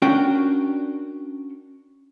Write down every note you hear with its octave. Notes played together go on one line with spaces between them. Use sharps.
C#4 D4 F#4 A#4 G5